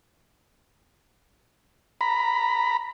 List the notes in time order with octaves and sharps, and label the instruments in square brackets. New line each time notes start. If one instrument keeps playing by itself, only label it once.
[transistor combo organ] A#5 B5